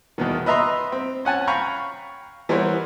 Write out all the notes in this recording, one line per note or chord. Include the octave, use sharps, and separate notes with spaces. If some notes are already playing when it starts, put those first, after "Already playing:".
E2 B2 D#3
B4 D#5 E5 A#5 C6
C4
C#4 F#5 G#5 A5
F5 G5 A#5 B5 C#6
E3 G3 B3 A#4 C5 C#5